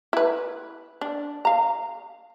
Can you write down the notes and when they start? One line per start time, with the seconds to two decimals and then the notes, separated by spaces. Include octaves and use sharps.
0.13 E4 B4
1.01 D4
1.45 F5 A#5